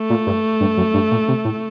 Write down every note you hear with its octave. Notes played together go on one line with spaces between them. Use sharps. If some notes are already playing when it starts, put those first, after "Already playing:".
Already playing: A3
A#2
G2
G2
F#2
G2
A#2
C3
A2